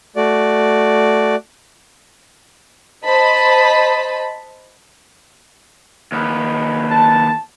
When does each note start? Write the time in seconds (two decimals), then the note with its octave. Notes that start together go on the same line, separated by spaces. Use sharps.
0.16 A3 F#4 D5
3.05 C5 D#5 A5 B5
6.12 D#2 B3
6.91 A5